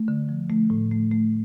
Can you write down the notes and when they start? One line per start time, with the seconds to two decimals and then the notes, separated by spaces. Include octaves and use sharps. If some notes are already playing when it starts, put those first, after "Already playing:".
Already playing: A3
0.08 D3
0.29 F3
0.50 A3
0.70 A2
0.91 A3
1.11 A3